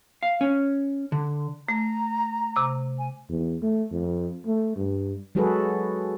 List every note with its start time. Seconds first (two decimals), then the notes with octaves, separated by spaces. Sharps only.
0.23 F5
0.41 C#4
1.12 D3
1.69 A3 A#5
2.56 C3 D6
2.98 G#5
3.29 E2
3.62 A3
3.92 F2
4.47 A3
4.76 G2
5.35 F#3 G#3 F#4 G#4 A4 B4